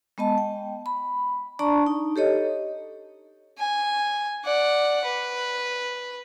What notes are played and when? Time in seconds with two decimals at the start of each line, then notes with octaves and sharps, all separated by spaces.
0.18 G#3 B3 D#5 A5
0.38 G5
0.86 B5
1.59 D4 D5 A5 A#5 C#6
1.86 D#4
2.16 G4 A4 C#5 D#5
3.59 G#5
4.44 D5 F#5
5.04 B4